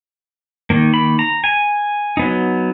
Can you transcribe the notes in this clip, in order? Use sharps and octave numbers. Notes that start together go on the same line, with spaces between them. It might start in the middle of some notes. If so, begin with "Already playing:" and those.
D#3 A#3
B5
A#5
G#5
F#3 B3 D#4